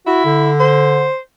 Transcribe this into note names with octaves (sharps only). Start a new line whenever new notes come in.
E4 F#4
D3
C5